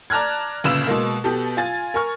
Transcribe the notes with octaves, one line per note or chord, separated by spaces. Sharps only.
D5 A5 A#5 F6 F#6 G#6
G1 A#2 C#3 B4 E6 E7
B2 G#3 A#3
B2 B3 G4 A4
F4 G#5 A6
A#4 G#5 C#6 F6